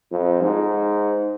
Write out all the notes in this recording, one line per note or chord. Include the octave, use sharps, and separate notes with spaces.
F2
G#2